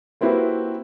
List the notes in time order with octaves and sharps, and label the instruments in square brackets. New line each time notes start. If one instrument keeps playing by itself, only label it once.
[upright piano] A#3 C4 E4 F#4 G4 B4